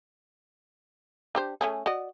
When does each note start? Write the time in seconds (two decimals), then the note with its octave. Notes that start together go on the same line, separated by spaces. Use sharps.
1.35 D4 G4 C5
1.61 A3 C#4 G#4
1.86 F#4 D5 D#5